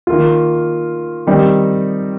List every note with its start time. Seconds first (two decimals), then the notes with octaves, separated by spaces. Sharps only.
0.07 D#3 A#3 F4
1.27 D#3 G3 C4 D#4